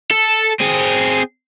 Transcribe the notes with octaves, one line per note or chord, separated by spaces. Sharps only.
A4
C4 G#4